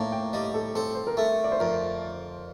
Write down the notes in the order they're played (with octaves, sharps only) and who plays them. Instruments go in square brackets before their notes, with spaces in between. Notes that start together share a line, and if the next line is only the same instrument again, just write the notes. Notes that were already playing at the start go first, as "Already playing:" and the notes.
Already playing: [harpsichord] A2 A#3 [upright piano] A5 A#5
[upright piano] G5
[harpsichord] G3 [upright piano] D#5
[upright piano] A4
[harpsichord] C4 [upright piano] A4
[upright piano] C5
A#4
[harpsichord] A3 [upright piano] A4
[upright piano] D5
C5
[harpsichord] F2 [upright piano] A#4